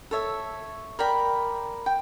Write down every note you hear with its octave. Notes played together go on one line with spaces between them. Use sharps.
A4 C#5 E5
A#4 D5 G5 B5
G5